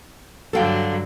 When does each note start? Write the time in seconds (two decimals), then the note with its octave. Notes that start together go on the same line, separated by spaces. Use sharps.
0.53 G2 D3 F#3 A4 F5 G5